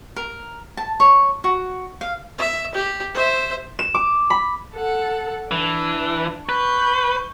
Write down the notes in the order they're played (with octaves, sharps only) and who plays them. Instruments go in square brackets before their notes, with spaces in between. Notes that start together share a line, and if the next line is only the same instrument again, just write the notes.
[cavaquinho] A#4
A5
C#5
F#4
F5
[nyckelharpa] E5
G4
C5 E5
[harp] E7
D6
B5
[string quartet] A4 F#5
[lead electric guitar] E3 [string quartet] D4
[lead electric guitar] B4 [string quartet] C#6 G6